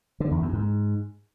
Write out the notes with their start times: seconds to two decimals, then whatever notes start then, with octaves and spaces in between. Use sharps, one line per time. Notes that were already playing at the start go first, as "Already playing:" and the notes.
0.20 D3
0.31 E2
0.42 F#2
0.53 G#2